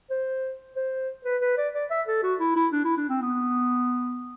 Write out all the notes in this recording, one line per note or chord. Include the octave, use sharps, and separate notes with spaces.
C5
C5
B4
B4
D5
D5
E5
A4
F#4
E4
E4
D4
E4
D4
C4
B3